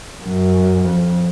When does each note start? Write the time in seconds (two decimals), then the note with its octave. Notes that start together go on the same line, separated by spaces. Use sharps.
0.23 F#2
0.84 F2